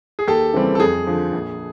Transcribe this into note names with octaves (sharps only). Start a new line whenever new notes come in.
G#4
D#2 G4 A4
C#3 E3 G3 C4
A4
F2 G#4
D3 F3
A#1